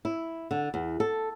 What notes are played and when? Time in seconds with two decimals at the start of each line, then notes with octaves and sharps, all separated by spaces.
0.05 E4
0.51 D3
0.74 E2
1.00 A4